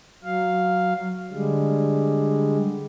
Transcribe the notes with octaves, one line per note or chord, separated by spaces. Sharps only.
F#3 F5
D3 G3 G#3